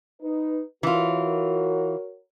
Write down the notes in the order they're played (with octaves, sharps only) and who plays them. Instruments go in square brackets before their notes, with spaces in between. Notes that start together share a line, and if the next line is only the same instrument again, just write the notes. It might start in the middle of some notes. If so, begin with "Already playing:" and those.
[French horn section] D#4 B4
[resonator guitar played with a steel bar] E3 F4 [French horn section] F#4 A#4 C#5